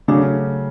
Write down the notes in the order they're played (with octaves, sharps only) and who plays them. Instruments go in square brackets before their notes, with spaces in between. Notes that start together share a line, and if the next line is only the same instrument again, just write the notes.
[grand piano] C#3 F#3 A3 C#4 [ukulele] D4